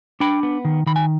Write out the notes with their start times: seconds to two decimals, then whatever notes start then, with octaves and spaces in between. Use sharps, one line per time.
0.20 D4 G5 B5
0.43 B3
0.65 D#3
0.86 D#3 B5
0.96 G#5